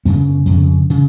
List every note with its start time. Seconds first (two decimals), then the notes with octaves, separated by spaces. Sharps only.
0.05 F#2 C#3 B3
0.46 F2 C#3
0.90 C#3